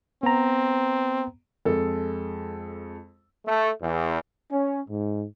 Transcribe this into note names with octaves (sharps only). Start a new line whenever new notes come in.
B3 C4 A#5
F2 G#3 A4
A3
E2
C#4
G#2